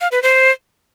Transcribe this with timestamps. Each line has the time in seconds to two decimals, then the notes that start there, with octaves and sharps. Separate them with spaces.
0.01 F5
0.12 B4
0.23 C5